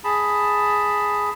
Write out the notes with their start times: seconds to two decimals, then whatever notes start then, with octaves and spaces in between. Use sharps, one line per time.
0.04 G#4 A5 B5